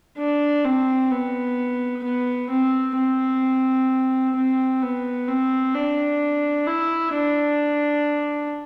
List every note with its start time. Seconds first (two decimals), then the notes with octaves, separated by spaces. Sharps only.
0.18 D4
0.64 C4
1.11 B3
2.04 B3
2.50 C4
2.97 C4
4.36 C4
4.82 B3
5.28 C4
5.74 D4
6.67 E4
7.14 D4